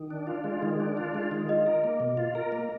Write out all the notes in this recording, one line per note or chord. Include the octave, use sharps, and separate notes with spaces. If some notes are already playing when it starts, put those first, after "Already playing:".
Already playing: D#3
D4
F4
G#3
D#3
D4
F4
G#3
D#3
F4 D#5
A#4
A#3
B2
F4
A#4
A#3